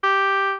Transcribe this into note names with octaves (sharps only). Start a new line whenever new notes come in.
G4